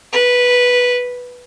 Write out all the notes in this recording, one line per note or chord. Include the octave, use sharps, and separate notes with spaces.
B4